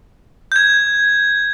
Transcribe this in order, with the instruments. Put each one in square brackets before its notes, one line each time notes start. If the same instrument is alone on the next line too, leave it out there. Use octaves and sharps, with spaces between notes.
[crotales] G6 G#6